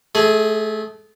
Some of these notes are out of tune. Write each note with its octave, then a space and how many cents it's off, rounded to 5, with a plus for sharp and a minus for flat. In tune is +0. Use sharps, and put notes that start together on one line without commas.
A3 -25 G#4 +0